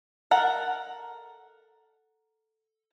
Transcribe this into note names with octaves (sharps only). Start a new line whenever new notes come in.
A4 A#4 F#5